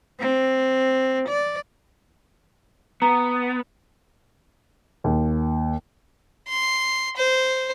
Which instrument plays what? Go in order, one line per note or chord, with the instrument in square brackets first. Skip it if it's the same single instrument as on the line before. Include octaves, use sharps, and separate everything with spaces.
[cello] C4
D5
[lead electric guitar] B3 [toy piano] A#5
[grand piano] D#2
[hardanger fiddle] C6
C5